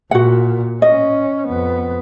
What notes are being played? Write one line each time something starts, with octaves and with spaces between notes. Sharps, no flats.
A#2 F#4 F#5
C#4 D#5
F2 B3